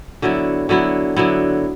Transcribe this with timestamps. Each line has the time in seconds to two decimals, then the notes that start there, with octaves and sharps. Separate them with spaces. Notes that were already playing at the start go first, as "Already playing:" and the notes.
0.22 D3 F#3 B3 E4
0.69 D3 F#3 B3 E4
1.16 D3 F#3 B3 E4